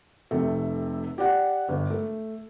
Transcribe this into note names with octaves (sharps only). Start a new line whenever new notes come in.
F1 C3 A3
G4 D5 F#5
G1
A3